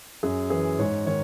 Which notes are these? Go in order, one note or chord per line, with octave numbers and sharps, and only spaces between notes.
F#2 G#4
E3 G#4
G#2 C#5
D#3 C#5